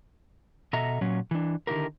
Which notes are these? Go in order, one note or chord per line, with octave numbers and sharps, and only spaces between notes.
B2 A4 D#5 E5 A#5
A#2 F#3 C#4
E3 D4
D3 D#3 D#4 E4 G4 A#4